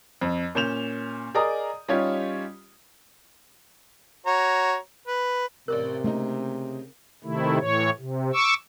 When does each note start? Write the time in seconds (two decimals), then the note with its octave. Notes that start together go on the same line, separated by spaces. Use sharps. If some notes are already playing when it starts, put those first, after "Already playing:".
0.21 F2
0.55 A#2 C#4 G6 E7 F7
1.34 G#4 A#4 D5 D#5 A#5 D#6
1.88 G3 C#4 D#4 F4 G4 C#5
4.26 F#4 C#5 A#5
5.07 B4
5.68 A1 C3 A#4 D5 F#6
6.04 C#3 A3 A#3 C4 D#4
7.24 C3 D#3 A3 E4
7.60 A2 E3 C#5
7.98 C3
8.34 C#6 D6 E6